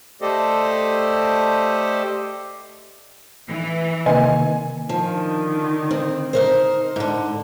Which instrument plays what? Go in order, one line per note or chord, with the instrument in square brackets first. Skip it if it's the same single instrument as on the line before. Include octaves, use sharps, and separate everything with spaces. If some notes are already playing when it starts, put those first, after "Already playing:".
[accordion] A3 G4 A4 C5 D5 D#5
[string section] E3
[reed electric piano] C3 D#3 A#3 [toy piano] D#5 [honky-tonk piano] G#5
[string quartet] D3 D#3 [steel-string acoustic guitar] F3
[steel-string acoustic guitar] C4
D#4 A#4 C5
G#2 D3